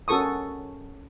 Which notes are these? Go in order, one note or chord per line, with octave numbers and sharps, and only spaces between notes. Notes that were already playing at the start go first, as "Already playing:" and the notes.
C#4 F#4 A4 A#4 C#6 D#6